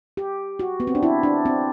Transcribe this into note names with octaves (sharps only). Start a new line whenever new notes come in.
G4
F#4
B3
C4
D4
E4
D4
C4